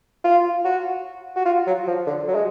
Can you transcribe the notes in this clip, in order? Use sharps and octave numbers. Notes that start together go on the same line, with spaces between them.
F4
F#4
F#4
F4
F#3
F3
D3
F#3
G#3